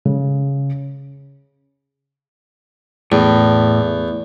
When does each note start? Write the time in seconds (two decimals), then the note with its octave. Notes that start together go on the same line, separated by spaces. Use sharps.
0.05 C#3
3.12 E2 A2